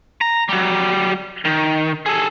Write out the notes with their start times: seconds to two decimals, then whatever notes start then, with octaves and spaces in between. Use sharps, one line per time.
0.21 A#5
0.49 F#3 G3
1.45 D#3
2.06 G#4 A4